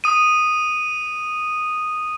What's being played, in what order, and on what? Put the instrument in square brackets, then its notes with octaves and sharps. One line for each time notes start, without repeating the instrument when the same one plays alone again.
[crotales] D#6 D#7